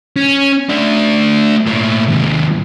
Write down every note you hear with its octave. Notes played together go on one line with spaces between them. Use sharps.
C#4
A3 D4
A2 A#3
D#2 G#2